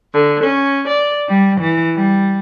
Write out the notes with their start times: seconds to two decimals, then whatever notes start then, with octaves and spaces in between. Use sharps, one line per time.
0.14 D3
0.43 C#4
0.88 D5
1.27 G3
1.60 E3
1.94 G3